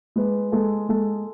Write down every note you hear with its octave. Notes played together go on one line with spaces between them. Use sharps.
G#3 B4
G#3 A4
G#3 A4